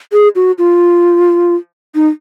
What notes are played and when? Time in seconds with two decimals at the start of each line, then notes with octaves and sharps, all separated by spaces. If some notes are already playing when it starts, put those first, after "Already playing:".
0.12 G#4
0.35 F#4
0.58 F4
1.95 D#4